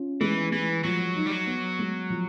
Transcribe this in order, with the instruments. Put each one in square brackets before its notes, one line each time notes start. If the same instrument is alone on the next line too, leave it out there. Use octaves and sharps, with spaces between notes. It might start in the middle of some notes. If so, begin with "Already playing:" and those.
Already playing: [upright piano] C#4 F4
[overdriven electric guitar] E3 [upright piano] G#3
[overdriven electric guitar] E3 [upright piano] G#3
[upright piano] F3 [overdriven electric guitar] F#3
[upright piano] D#4
[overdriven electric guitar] G3
F#3
[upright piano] B3
G#3
F3